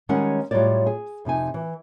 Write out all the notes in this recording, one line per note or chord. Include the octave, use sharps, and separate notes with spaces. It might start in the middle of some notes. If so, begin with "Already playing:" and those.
D#3 G3 G#3 C#4 C#5 F#5
A2 F#3 G3 F4 C#5 D5
G#4
F2 C3 D#4 G#5
E3